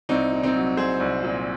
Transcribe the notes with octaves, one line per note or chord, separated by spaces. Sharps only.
C2 C4 D#4
A#2
C4 D#4
F#3
C2 G#4 C5
C2
A#2